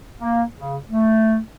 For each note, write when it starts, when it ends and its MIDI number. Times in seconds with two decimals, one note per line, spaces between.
0.19 0.43 58
0.55 0.78 49
0.89 1.38 57